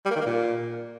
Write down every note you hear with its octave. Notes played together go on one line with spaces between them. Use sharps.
G3
A#3
D#3
A#3
A#2